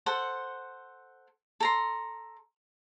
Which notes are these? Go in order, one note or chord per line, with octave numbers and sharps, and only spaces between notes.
A4 C5 F#5
A4 A#5 C6